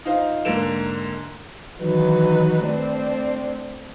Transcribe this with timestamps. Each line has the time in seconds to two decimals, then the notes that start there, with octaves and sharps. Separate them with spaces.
0.05 D#4 F4 C5 F5
0.45 G#2 D3 A#3 D7 E7
1.79 D#3 E3 F#3 D#4 B4
2.63 A3 C4 D4